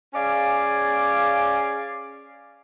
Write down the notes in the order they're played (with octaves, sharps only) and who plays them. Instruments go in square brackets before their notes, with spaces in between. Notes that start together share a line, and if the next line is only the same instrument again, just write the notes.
[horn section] C#4 G#4 D5 F5 G#5